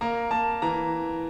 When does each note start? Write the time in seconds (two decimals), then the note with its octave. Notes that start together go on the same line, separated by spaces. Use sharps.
0.01 A#3 A#5
0.31 A#3 A5
0.62 E3 A#5